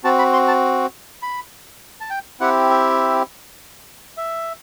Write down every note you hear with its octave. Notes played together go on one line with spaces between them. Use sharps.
C4 F#4 A5
B5
C6
A5
B5
A5
G5
C4 E4 G4 F#5
E5
E5